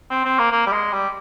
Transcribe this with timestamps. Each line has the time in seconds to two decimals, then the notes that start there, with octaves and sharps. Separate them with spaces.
0.10 C4
0.25 C4
0.39 A#3
0.52 A#3
0.67 G3
0.72 G#3
0.93 G3